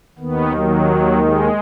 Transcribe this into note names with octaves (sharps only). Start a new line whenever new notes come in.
D#2 D#3 B3
F#3
G#3